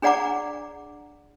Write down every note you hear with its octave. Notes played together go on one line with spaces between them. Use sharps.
D4 G#4 D5 F#5 A#5 D6